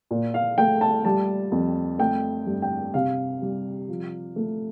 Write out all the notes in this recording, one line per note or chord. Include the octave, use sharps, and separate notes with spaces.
A#2
F5
A3 G5
A5
G3 A5
F2
A3 G5
G2
G5
C3 F5
G3
F3
A3